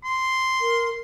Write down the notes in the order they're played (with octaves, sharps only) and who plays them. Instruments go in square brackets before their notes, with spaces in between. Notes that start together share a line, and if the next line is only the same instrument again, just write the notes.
[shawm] C6
[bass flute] A#4